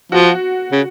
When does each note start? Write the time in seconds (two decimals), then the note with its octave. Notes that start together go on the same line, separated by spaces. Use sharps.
0.12 F3 F#4
0.72 C#3